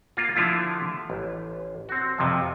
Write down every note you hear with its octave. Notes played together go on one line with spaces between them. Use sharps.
A#3 F4
D3 F3 A3 E4 F4
A1
C4 F#4
F2 C3 F3